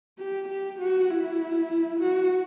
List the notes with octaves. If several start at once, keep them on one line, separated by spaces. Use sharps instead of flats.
G4
G4
F#4
E4
F#4